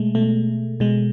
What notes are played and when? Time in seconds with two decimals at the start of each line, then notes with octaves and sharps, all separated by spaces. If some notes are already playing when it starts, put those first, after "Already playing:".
Already playing: B2 G#3 A3
0.15 B2 A3
0.80 B2 G#3